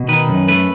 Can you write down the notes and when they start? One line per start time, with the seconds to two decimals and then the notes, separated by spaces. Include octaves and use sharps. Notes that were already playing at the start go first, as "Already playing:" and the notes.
Already playing: B2
0.08 D#3 B4
0.29 F#2
0.48 A3 B4